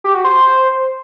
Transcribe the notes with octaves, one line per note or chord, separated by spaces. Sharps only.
G4
F#4
C5